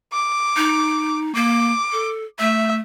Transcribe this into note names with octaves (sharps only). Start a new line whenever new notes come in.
D6
D#4
A#3 D6
A4
A3 E5